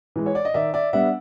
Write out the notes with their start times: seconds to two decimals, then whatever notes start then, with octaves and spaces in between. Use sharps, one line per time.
0.16 E3 G#3
0.26 C#5
0.35 D5
0.45 D#5
0.54 D#3 D5 E5
0.74 D5 E5
0.93 G3 B3 D4 E5 F#5